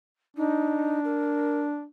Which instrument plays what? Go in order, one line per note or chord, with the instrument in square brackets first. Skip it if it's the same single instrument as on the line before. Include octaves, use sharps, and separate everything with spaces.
[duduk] D4 [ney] D#4
[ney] A#4